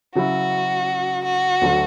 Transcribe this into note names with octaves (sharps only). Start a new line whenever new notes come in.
C#3 F#3 C#4 E4 F#4
F#4
D2 D3 F#3 A3 D4